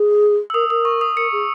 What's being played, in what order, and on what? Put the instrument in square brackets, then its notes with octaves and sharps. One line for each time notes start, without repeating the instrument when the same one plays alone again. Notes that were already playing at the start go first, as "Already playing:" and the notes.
Already playing: [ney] G#4
[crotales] E6
[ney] A#4 [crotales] D#6
[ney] A#4 [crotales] D#6
[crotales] C#6
D#6
[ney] A#4 [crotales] C#7
[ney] G#4